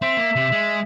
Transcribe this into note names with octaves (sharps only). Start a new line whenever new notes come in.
C4 E5
A#3
C3
G#3